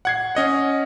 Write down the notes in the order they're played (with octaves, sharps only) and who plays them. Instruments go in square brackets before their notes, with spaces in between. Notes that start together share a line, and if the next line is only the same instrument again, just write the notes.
[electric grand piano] F#5 G#6 C7
C#4 D#5 F#5